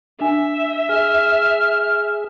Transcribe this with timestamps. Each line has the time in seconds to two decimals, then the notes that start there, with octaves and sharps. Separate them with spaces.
0.21 D4 E5 G#5
0.89 G#4 F6